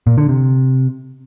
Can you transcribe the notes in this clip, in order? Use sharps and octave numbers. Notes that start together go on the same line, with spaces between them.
A#2
D3
C3